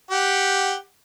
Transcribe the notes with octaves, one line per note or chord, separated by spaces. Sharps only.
G4 F#5